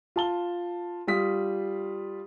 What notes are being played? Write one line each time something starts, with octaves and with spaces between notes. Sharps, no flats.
F4 A5 G7
G3 F4 D#6 B6